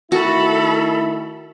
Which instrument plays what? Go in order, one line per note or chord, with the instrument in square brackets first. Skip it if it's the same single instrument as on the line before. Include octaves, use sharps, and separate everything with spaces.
[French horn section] D#3 A3 E4 [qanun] F#4 [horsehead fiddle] A4 B5